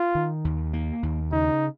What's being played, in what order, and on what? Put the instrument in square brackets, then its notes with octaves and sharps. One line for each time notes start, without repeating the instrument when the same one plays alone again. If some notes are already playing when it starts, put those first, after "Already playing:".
Already playing: [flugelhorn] F4
[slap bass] D#3
D#2
A#3
D#2
[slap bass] C#3 [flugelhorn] D#4